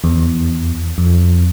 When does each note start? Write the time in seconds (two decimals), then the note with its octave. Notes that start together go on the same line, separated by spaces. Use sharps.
0.04 E2
0.98 F2